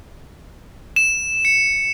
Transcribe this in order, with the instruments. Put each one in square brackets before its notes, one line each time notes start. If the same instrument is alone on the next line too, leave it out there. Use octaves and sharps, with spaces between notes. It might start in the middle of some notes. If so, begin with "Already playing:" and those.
[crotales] E7
C#7